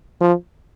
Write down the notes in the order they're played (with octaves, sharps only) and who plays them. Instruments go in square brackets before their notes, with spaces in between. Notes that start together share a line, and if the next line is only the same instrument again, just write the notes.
[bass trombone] F3